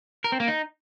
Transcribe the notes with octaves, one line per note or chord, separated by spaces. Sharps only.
A#4
C4
A#3
D#4